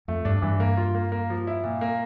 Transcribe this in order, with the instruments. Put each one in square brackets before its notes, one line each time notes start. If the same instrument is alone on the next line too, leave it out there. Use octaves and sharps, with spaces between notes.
[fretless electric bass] F2 [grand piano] A3
[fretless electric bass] G2 [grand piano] D4
[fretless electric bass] G2 [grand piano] E3
[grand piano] A#3
F4
A#3
A#3
F3
E4
A#2
A#3